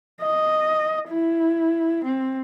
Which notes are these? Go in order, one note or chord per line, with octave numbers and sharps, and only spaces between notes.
D#5
E4
C4